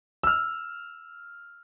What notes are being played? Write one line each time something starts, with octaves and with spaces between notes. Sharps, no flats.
E6 F6